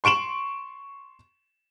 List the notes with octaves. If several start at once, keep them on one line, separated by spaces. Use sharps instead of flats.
C6 C#6 D7 E7 F#7